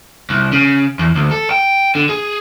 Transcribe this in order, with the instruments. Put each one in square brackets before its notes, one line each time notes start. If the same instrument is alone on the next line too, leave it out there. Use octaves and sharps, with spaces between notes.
[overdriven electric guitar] C2
C#3
E2
D2
A4
G5
D3
G#4